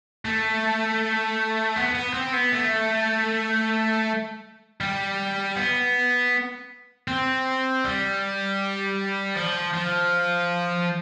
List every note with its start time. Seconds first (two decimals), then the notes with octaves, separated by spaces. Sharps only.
0.25 A3
1.77 B3
1.95 B3
2.14 C4
2.34 B3
2.52 A3
4.81 G3
5.56 B3
7.08 C4
7.84 G3
9.36 F3
9.74 F3